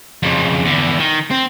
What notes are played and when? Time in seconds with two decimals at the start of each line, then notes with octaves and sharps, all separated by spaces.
0.23 F2 C#3
0.65 E2 D3
0.99 D#3
1.30 C4